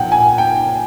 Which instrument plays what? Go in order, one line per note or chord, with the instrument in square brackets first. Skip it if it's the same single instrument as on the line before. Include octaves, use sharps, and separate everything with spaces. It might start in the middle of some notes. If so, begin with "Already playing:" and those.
Already playing: [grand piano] A#2 F3 A#3 F#5 G5
G#5
G5